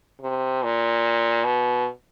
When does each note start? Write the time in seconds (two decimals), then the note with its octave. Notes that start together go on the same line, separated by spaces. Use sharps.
0.21 C3
0.63 A#2
1.44 B2